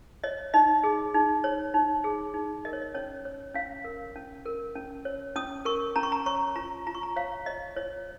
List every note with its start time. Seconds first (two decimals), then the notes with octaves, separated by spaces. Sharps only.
0.24 C#5 D#5
0.54 D#4 D#5
0.84 G#4
1.14 D#4
1.44 C#5
1.74 D#4
2.04 G#4
2.34 D#4
2.65 A#4 D#5
2.73 C#5
2.82 D#5
2.94 C#4 C#5
3.25 C#5
3.54 C#4 F5
3.84 A#4
4.16 C#4
4.46 A#4
4.75 C#4
5.05 C#5
5.36 C#4 D#6
5.65 A#4 C#6
5.96 C#4 A#5
6.03 C#6
6.12 A#5
6.26 C#5 C#6
6.56 F4 A#5
6.87 F4 A#5
6.95 C#6
7.03 A#5
7.16 C#5 F5
7.46 C#5 D#5
7.76 F4 C#5